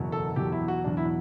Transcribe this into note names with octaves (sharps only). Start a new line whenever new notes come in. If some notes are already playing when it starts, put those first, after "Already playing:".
Already playing: F#1 E2 B2 F#3
A4
E2 B2 F#3 G4
E4
F#4
E2 B2 F#3 D4
E4